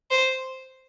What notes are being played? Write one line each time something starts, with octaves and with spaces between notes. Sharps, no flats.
C5